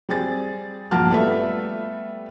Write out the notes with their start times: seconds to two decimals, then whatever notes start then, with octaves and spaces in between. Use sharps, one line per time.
0.09 G3 C4 G#4 A6
0.91 A#1 G2 A#3 F#5 A5 F6
1.10 G3 A3 B3 F4 A4 E5